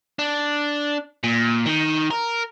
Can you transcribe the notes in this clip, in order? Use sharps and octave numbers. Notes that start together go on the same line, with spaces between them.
D4
A#2
D#3
A#4